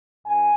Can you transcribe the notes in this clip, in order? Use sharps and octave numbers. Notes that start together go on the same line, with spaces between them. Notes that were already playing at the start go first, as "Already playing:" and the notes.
F#2 G#5